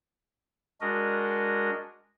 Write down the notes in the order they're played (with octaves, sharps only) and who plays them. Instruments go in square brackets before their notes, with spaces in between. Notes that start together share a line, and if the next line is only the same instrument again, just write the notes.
[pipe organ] G#3 D4 F#4 A#4 D#5